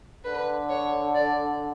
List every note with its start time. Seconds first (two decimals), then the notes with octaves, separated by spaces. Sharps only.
0.24 D3 B4
0.70 C#5
1.15 D5